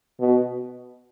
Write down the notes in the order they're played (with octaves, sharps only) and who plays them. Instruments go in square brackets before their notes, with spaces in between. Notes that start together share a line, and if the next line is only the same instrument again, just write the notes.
[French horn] B2